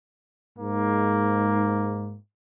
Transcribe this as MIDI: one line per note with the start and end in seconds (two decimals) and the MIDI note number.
0.59 2.17 44
0.59 2.18 58